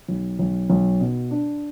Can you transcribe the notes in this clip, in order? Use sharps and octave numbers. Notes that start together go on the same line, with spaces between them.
B1
B1
B1
B2
D4